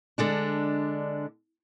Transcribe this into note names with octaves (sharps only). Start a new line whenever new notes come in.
D3 G#3 D4